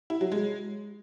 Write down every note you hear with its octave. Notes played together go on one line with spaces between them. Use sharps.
E4
F#3
G#3